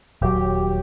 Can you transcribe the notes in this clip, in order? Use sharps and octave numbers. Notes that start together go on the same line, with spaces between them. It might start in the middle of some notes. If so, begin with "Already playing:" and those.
D#1 F#3 G4